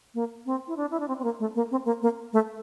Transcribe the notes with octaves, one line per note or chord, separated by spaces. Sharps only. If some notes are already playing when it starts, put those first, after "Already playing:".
A#3
C4
E4
D4
E4
D4
C4
C4
A#3
A3
A#3
C4
A#3
A#3
A3